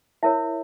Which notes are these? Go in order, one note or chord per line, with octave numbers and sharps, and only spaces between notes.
E4 A#4 C#5 E5